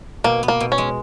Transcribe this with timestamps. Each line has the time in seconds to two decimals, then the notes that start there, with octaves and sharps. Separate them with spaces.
0.24 B2 A#3
0.43 B3
0.48 A#3
0.60 B2
0.72 C#4
0.78 G#3